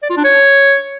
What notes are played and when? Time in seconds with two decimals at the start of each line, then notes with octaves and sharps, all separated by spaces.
0.02 D5
0.10 F4
0.17 D4
0.24 C#5